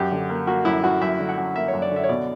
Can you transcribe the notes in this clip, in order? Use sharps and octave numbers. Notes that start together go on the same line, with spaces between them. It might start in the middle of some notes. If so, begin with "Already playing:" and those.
Already playing: F#2 G4
D3
A#3
A#3 F#4
F#2 E4
F#2 F#4
F#2 E5
D3
F#5
F#2
A#3 E5
C#5
F#2
D5
D3 E5
C#5
B2 D5